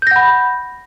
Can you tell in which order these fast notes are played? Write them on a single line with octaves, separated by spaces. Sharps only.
G6 A#6 F#5 B5